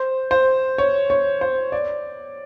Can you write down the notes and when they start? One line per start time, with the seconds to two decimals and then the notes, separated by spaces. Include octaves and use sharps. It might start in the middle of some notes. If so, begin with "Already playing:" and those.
Already playing: C5
0.31 C5
0.78 C#5
1.10 C#5
1.41 C5
1.72 D5